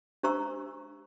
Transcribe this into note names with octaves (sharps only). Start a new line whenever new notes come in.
D4 G4 C5 A#5 C#6 E6